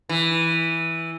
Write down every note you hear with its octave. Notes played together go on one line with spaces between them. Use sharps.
E3